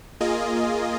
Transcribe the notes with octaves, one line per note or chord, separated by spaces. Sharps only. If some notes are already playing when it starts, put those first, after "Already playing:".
A#3 F4 G#4 D#5